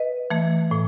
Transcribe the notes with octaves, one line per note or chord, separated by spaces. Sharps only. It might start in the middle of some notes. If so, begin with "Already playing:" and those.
Already playing: B4 D#5
E3 A3
A2